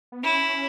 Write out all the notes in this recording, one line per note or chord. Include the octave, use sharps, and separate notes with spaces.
B3
C#4 E4